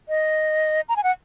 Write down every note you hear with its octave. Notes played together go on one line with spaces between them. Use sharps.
D#5
A#5
G#5
F#5